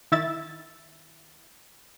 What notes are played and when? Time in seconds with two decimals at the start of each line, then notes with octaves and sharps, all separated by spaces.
0.12 D#3 E4 E5 A6